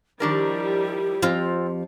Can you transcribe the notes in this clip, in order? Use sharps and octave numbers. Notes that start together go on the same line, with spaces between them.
D#3 F3 G3 D4 E4 G4 A#4
F2 F3 C4 F4